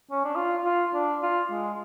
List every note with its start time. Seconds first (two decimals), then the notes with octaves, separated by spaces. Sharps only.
0.11 C#4
0.24 D4
0.36 F4
0.65 F4
0.94 D4
1.22 F4
1.51 G#3